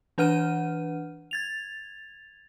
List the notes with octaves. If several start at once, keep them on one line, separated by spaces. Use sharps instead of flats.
E3 D4 B4 F#5 F6 D#7
G#6 A6 F7